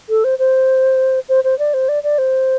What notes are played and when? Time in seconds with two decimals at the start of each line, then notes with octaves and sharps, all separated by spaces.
0.09 A4
0.24 C5
0.39 C5
1.29 C5
1.44 C5
1.59 D5
1.74 C5
1.89 D5
2.03 D5
2.18 C5